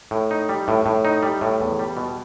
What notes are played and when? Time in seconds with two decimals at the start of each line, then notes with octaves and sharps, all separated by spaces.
0.11 A2
0.31 D#4
0.49 G3
0.68 A2
0.86 A2
1.05 D#4
1.23 G3
1.41 A2
1.61 E2
1.79 G3
1.97 B2